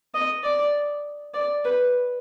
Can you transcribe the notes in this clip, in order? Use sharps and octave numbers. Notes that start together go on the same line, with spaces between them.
D#5
D5
D5
B4